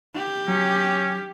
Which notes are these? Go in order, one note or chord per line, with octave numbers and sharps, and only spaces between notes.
G4
F#3 C#4